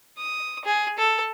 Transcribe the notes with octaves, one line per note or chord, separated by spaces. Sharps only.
D#6
G#4
A4